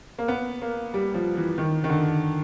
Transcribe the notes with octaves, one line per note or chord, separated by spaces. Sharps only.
A#3
B3
A#3
G3
F3
E3
D#3
D#3
D3